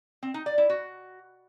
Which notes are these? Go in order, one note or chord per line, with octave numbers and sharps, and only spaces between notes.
C4
D#4
D5
E4
F#4